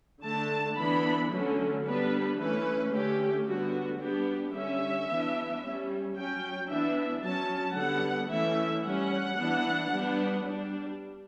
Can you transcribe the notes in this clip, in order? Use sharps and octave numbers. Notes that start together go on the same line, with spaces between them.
D3 A3 D4 A5
E3 B3 D4 B5
D3 F#3 A3 C#4
G3 B3 D4 B4
E3 A3 C#4 B4
D3 A3 C#4 G4
D3 G3 B3 F#4
G3 B3 D4 G4
D3 G3 C#4 E5
E3 B3 D4
G3 C#4
F#3 C#4 G5
E3 B3 D4 E5
F#3 C#4 A5
D3 G3 B3 F#5
E3 A3 C#4 E5
G3 C#4 F#5
E3 B3 D4
G3 B3 D4
G3 D4